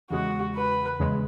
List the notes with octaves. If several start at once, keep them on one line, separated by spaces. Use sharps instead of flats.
E2 C#3 G#3 F#4
B4
E2 C#3 G#3